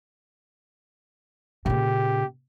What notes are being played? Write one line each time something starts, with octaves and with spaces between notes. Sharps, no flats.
A#2 C#3 G4